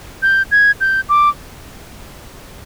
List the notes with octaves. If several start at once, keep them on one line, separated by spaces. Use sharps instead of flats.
G6
G#6
G6
D6